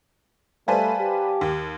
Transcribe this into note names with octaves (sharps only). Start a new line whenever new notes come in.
G3 A3 B4 C5 F5 G#5 A5
G4
D#2